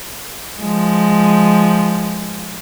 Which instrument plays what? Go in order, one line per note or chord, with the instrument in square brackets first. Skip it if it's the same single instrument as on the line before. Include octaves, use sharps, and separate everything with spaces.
[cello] F3 G#3